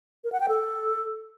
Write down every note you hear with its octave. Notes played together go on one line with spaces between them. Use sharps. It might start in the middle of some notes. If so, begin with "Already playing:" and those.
A#4
F#5
G5
A4